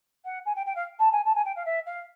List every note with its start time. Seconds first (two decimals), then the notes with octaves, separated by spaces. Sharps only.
0.25 F#5
0.45 G#5
0.56 G5
0.66 G5
0.76 F5
0.99 A5
1.12 G#5
1.25 A5
1.35 G#5
1.45 G5
1.56 F5
1.65 E5
1.86 F5